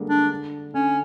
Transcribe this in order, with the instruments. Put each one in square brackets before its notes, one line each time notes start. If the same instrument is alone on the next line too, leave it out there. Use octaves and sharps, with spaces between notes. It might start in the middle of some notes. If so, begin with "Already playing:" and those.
Already playing: [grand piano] D3 G3 G#3 A#3
[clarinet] D4
[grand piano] D3 [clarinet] C#4